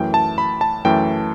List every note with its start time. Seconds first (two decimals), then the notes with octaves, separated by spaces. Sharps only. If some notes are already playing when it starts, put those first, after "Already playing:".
Already playing: F#2 E3 A3 G5
0.14 A5
0.38 B5
0.61 A5
0.85 F#2 E3 A3 G5